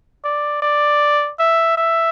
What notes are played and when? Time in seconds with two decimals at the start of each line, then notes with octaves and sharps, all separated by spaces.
0.24 D5
0.62 D5
1.39 E5
1.77 E5